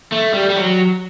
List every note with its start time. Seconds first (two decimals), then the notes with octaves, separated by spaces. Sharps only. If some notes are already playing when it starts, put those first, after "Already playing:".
0.12 A3
0.34 G3
0.50 G3
0.57 F#3